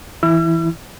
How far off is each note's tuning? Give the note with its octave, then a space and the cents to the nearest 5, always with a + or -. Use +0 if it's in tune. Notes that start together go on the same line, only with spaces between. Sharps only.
E3 +0 E4 +0 E6 +45